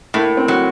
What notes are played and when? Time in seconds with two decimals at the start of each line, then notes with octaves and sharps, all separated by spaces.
0.14 A2 A#3
0.37 C4
0.48 F#3